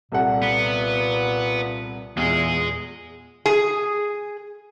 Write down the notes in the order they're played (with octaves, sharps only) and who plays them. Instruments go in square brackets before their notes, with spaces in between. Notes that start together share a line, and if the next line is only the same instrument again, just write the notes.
[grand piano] C2 A4 F#5 [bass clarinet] A#2
[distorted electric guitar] B3
[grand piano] E2 [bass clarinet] A#2 [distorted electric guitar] G#3 G#4
[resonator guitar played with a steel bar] G#4